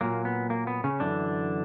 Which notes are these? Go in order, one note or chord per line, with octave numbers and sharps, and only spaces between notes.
A#2 F#3 A#3
B3
A#3
B3
C#3 C#4
F#2 D3 E3 D4